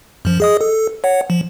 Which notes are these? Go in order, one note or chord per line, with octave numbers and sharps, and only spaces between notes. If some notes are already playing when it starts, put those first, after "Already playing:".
F#2 F3
G#4 D#5 D#6
A4
C#5 F#5
F3